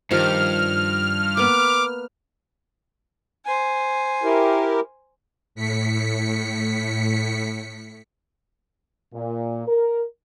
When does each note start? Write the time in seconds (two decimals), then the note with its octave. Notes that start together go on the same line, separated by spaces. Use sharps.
0.11 G2 D#3 F3 G4 F6
1.37 A#3 B3 B4 D6
3.45 C5 G#5
4.23 E4 G4 A#4
5.55 A2 B6 C#7
9.14 A#2
9.68 A#4